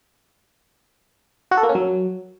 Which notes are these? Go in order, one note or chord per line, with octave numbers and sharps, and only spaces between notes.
F#4
A4
A#3
C#4
F#3